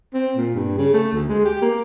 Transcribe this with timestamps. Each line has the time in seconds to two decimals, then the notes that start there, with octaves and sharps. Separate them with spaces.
0.14 C4
0.37 A#2
0.55 G2
0.78 C#3
0.94 A3
1.13 D2
1.29 G#3
1.45 G4
1.62 A#3